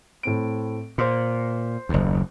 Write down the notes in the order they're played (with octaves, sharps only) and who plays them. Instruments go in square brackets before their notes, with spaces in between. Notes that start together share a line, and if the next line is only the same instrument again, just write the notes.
[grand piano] A2 C4 D7
[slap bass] A#2 [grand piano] C5 C6
[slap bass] F#1 D#2